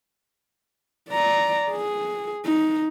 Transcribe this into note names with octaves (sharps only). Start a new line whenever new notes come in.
D5 A#5
G#4
D#4